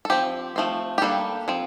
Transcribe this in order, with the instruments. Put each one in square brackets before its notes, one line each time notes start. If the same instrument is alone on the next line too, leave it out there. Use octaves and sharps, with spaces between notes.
[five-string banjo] A4
F3 C4 G4
F3 A3 C4
G4
G3 A#3 D4 A4
F3 C4